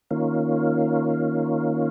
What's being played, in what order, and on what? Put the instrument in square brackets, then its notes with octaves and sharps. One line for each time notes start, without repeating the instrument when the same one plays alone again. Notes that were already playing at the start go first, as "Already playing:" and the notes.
[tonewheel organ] D#3 A#3 C#4 F4